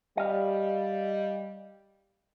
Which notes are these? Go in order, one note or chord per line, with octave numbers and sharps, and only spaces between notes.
G3 D#5 F5